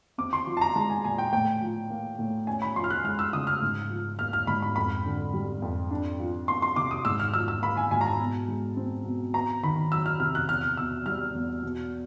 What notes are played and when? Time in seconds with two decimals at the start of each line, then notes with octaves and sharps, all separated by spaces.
0.18 C4 D6
0.33 C6
0.47 F3
0.57 A5
0.61 A#5
0.76 G#3 A5
0.90 G#5
1.04 A#2 G#5
1.18 G5
1.32 A2 G5
1.61 F3
1.90 A#3
2.19 A2
2.47 C#4 G#5
2.62 B5
2.76 F3 C6
2.84 F6
2.90 F#6
3.04 G#3 F6
3.19 E6
3.33 C#3 D#6
3.47 F6
3.62 G#2
3.90 F3
4.19 A#3 F6
4.33 F6
4.47 G#2 B5
4.62 B5
4.76 F2 B5
5.05 D3
5.33 G3
5.62 F2
5.90 D4
6.20 F3
6.48 A#3 C6
6.62 C6
6.76 C3 D6
6.91 D#6
7.05 G#2 E6
7.19 F6
7.34 F3 E6
7.48 E6
7.62 A#3 B5
7.77 G#5
7.91 G#2 G#5
8.01 A#5
8.06 A5
8.20 B2
8.48 G#3
8.77 C4
9.05 B2
9.34 B3 A#5
9.63 D#3 B5
9.92 F#3 E6
10.06 F6
10.20 C3 F6
10.35 F#6
10.49 E2 F6
10.77 B2 E6
11.06 G3 F6
11.35 E2
11.63 B2